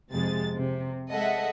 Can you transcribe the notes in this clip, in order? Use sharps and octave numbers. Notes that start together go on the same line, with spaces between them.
F2 C3 G#3 A6
C3
G#3 A4 D#5 E5 F#5